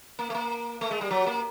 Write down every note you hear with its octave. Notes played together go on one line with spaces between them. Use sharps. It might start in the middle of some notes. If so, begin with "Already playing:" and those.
A#3
A3
A#3
A3
G#3
G3
F#3
A#3